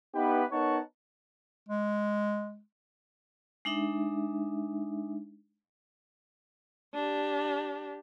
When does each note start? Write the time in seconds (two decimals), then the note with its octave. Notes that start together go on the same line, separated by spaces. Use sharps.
0.14 B3 D#4 E4 G4 B4
0.52 B3 D#4 A#4 C#5 F#5 A5
1.69 G#3
3.65 G#3 D4 D#4 E5
6.95 D4 G4